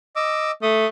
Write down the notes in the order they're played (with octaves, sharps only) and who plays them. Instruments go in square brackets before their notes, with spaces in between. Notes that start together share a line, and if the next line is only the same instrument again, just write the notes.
[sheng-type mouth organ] D#5 D6 E6
[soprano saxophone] A3 [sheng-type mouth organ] D#6